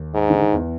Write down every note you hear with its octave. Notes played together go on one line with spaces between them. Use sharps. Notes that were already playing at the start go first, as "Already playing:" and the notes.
Already playing: D#2 D#3
G#2
D3
D#3
E2 E3